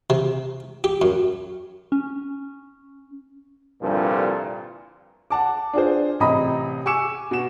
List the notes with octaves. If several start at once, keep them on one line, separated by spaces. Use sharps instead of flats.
C3
G4
F#2
C#4
C2 G2 A#2 D3 F3
F#5 A5 D6
D4 F4 G#4 C5
A1 C3 D#5 A#5 B5 D#6
G#5 C#6 D6 E6 C#7 E7
B2 E7